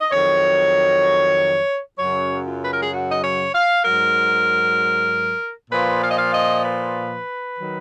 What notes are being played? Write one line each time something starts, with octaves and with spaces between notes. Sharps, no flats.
D#5
F2 D#3 F#3 C#5
F#2 C#3 F#3 C#5
F4
B4
A#4
G#4
F#4
D#5
C#5
F5
G#2 F#3 A#4
A#2 F3 B4
F5
D#5
F5
D#5
B4
D#3 F#3